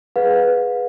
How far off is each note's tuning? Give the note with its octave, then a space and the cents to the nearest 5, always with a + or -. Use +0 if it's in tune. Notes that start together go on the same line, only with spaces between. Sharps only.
G#4 +0 B4 +0 F5 +45